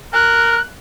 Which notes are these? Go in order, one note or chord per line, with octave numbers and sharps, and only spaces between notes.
A#4 F#6